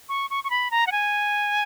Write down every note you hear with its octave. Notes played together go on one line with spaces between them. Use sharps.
C#6
C#6
C#6
B5
A#5
F#5
G#5